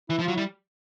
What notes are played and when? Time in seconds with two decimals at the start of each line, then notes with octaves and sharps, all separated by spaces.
0.10 E3 E4
0.19 F3
0.23 F4
0.28 F#3
0.35 G3 E4